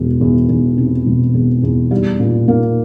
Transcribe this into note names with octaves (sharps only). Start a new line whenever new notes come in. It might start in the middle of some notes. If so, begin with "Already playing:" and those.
Already playing: E1 E2
E2
E2
C3
E1
E2
E2
G3
A#2
A#3